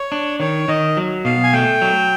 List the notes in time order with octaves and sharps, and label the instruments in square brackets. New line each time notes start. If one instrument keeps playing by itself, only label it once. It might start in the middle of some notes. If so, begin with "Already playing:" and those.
Already playing: [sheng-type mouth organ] C#5
[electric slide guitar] D4
[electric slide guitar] D#3 [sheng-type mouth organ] C#5
[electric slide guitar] D#3 [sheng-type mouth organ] D#5
[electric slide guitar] F#3
[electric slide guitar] B2 [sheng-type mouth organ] F5
[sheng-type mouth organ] G#5
[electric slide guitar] A3 [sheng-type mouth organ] G5
[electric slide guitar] F#3